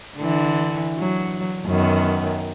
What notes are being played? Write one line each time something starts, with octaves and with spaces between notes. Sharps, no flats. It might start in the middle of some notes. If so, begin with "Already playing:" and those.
D3 E3
F#3
F#2 D#3 B3